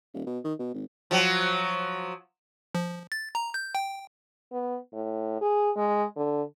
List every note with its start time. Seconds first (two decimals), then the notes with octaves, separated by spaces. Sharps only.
0.14 D#1
0.26 B2
0.44 D#3
0.59 B2
0.74 G#1
1.11 F3 F#3
2.75 F3
3.12 A6
3.35 A#5
3.54 G6
3.75 G5
4.52 B3
4.93 A2
5.41 G#4
5.76 G#3
6.16 D3